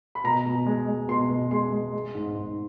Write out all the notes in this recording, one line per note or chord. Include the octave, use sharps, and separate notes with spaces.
B5
B2 A#5
B2
G#3
G#3
B2 C6
B2
G#3 C6
G#3
G#3
G#2
G#2